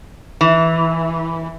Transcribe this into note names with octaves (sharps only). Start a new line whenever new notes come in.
E3